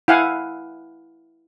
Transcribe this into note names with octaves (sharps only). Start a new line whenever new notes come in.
E4 F5 F#5 G#5